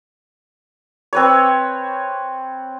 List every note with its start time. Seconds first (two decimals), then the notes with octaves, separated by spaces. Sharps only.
1.13 C4 B4 C#5